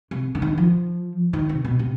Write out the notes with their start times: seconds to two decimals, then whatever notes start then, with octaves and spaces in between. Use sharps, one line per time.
0.11 C3
0.35 D3
0.42 D#3
0.58 F3
1.33 D#3
1.49 C3
1.65 B2
1.79 C3